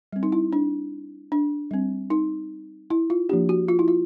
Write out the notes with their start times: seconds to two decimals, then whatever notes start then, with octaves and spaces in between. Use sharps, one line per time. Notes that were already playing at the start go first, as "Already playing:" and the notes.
0.13 G3 C4
0.23 D#4
0.32 E4
0.53 D4
1.32 D4
1.71 G3 C4
2.10 D#4
2.90 E4
3.10 F4
3.29 F3 A#3 D4 G4
3.49 F#4
3.68 F4
3.79 E4
3.88 F4